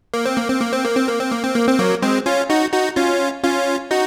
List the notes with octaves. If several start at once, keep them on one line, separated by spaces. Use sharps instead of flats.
A#3
C4
A#3
C4
A#3
C4
A#3
C4
A#3
C4
A#3
C4
A#3
C4
F#3 A#3
G#3 C4
C#4 F4
D#4 F#4
D#4 F#4
C#4 F4
C#4 F4
D#4 F#4